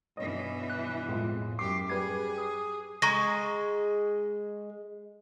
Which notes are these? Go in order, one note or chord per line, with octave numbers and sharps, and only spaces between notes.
G2 B2 E3 C#5 D#5
F#6
F2 A2 G#3 F4
F#2 G4 D6 C7
G3 G#4 B4 G#6
D#6
G#3 A#5 C#6 A#6